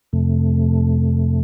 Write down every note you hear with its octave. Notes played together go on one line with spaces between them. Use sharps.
F2 C3 A3